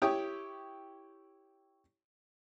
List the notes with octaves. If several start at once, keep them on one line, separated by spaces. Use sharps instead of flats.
E4 G4 C#5 G5 C#6 D#6